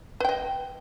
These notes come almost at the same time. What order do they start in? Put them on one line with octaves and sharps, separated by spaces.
B4 G5 D#5